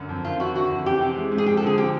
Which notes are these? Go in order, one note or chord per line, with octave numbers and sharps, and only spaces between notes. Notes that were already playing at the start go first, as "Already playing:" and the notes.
Already playing: F#2 D3
F2
D#3 F4
E4 F#4
D3 F#4
F2
E3 G4
C3
G#3
G#2
G#4
F3 G4
A4
D3 G#4
F3 G4